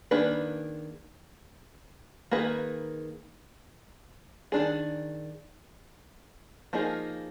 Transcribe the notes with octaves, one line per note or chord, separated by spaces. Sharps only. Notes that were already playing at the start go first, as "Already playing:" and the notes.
D#3 A#3 D4 G#4 B4
D#3 A#3 D#4 G#4 B4
D#3 G#3 D4 G#4
F3 A#3 D#4 G#4